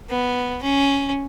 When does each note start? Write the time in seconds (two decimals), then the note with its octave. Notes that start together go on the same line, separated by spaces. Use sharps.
0.09 B3
0.63 C#4